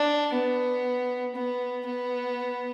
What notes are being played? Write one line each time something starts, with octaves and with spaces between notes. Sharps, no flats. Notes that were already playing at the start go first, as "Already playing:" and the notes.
Already playing: D4
B3
B3
B3